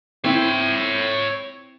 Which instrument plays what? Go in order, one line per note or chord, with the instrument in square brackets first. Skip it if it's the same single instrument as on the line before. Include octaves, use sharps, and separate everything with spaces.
[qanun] C4 E4 [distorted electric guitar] C#5 E5